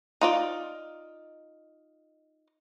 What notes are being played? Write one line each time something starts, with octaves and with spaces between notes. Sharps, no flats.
D#4 F4 D5